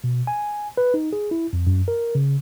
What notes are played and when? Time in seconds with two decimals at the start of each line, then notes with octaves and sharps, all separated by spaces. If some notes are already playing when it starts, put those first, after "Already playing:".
0.04 B2
0.27 G#5
0.77 B4
0.94 D#4
1.13 G#4
1.31 E4
1.53 F2
1.67 F#2
1.88 A#4
2.15 C#3